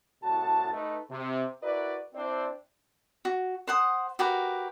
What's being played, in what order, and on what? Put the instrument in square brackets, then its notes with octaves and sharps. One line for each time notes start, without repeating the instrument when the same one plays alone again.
[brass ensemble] C2 A2 F#4 A5
A3 D#4 B4
C3
E4 F#4 A#4 B4 D5
C4 D4 E4 C5 D5
[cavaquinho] F#4
C5 F#5 D#6
F#4 G4 A#4 B4